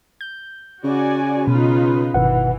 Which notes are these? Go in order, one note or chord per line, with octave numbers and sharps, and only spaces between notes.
G6
C#3 F#4 D5 G#5
B2 D#4 F4 B4
G1 B2 D#3 E3 B4 F#5